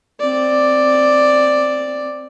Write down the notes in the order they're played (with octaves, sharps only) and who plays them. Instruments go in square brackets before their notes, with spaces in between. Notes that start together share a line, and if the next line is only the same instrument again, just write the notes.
[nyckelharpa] C4 D5